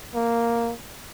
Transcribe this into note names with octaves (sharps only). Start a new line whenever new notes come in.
A#3